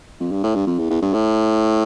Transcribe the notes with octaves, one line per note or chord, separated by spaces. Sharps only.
F2
G2
A2
G2
F2
E2
E2
G2
A2